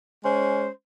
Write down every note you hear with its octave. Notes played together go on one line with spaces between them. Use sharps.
G#3 C#4 C5